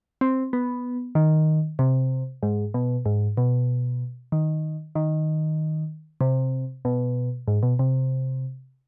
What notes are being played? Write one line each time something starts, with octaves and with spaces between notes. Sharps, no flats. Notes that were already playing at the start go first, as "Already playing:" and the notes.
C4
B3
D#3
C3
G#2
B2
G#2
B2
D#3
D#3
C3
B2
G#2
B2
C3